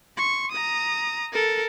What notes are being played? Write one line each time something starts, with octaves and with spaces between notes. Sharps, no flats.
C6 C#6
A#5 D#6
A4 A#4